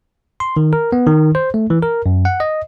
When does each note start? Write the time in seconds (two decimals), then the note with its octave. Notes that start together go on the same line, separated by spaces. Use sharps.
0.40 C6
0.57 D#3
0.73 A#4
0.92 B3
1.07 D#3
1.35 C5
1.54 A3
1.70 E3
1.83 A#4
2.06 F#2
2.25 F#5
2.40 D#5